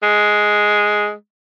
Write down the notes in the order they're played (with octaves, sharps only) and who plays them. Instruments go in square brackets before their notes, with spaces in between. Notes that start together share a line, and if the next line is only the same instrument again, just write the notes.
[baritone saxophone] G#3